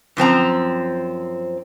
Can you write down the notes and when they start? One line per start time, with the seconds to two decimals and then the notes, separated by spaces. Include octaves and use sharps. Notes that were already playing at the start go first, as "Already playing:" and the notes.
0.17 F#2 F3 C4 A#5